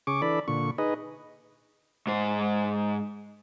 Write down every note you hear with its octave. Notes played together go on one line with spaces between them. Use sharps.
C#3 G#4 C#6 D6
E3 D4 A4 D5 B5
A#2 D3 C#6
D#4 G#4 B4 D#5
G#2 C5